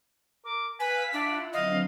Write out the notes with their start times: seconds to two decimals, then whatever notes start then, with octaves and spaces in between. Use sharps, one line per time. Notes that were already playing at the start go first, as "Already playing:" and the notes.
0.45 A#4 D6
0.80 B4 F5 G#5 E6 B6
1.13 D4 E4 F4 F#5
1.53 D3 F#3 C4 D#5 F5